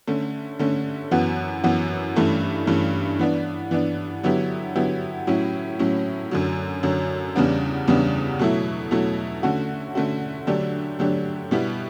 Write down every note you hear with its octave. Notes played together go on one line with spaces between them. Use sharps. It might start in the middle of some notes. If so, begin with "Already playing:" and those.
D3 A3 C#4
D3 A3 C#4
F#2 E3 B3 F#4
F#2 E3 B3 F#4
G2 E3 A3 C#4
G2 E3 A3 C#4
E3 B3 D4
E3 B3 D4
D3 F#3 B3 E4 G4
D3 F#3 B3 E4 G4
A2 F#3 C#4 E4
A2 F#3 C#4 E4
F#2 D3 F#3
F#2 D3 F#3
E2 C#3 G3 B3 D4
E2 C#3 G3 B3 D4
B2 F#3 A3 E4
B2 F#3 A3 E4
D3 A3 C#4 F#4
D3 A3 C#4 F#4
D3 F#3 A3 D4 G4
D3 F#3 A3 D4 G4
B2 G3 B3 E4 G4